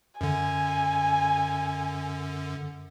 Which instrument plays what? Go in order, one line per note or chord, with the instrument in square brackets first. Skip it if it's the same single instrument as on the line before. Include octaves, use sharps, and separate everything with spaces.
[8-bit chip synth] F#2 D3 [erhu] G#5